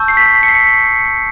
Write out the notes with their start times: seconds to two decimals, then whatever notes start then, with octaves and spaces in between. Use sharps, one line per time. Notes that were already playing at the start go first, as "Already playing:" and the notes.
Already playing: A5 C#6 E6 G6
0.08 C7
0.17 B6
0.43 C#7
0.48 C7